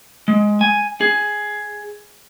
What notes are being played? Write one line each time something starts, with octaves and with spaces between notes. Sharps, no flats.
G#3
G#5
G#4